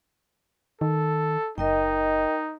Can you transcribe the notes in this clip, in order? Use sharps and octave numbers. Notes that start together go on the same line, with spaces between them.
D#3 A4
F#1 D#4 A#4 D#5 G5